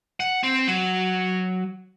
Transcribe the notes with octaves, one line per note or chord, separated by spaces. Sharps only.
F#5
C4
F#3